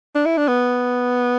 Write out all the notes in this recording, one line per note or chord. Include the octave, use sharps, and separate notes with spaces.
D4
E4
D4
B3